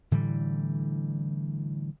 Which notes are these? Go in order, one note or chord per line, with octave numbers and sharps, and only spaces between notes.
A2 D3 E3 G3